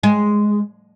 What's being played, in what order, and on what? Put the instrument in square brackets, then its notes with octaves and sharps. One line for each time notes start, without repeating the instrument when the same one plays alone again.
[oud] G#3